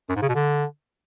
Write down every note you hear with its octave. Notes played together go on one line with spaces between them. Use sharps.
F#2
G#2
C#3
B2
D3